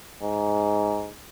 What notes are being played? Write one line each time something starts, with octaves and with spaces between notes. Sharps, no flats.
G#2